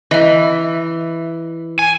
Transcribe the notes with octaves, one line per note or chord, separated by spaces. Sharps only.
E3 D#5 E5
G#5